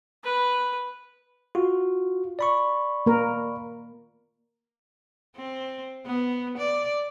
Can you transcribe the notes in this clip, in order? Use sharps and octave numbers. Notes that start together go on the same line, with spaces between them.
B4
F4 F#4
D5 B5 C#6
A#3 A#4
C4
B3
D5